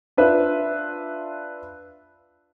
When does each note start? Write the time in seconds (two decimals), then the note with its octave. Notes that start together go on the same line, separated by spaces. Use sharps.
0.17 D4 F4 B4 E5